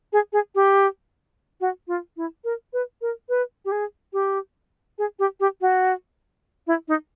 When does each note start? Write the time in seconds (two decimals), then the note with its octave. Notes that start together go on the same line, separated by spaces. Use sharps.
0.13 G#4
0.33 G#4
0.55 G4
1.61 F#4
1.88 F4
2.17 E4
2.44 A#4
2.73 B4
3.02 A#4
3.29 B4
3.65 G4
3.72 G#4
4.13 G4
4.98 G#4
5.19 G4
5.40 G4
5.61 F#4
6.67 E4
6.88 D#4